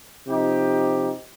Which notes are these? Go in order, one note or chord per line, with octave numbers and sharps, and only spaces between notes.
C3 F3 D#4 G4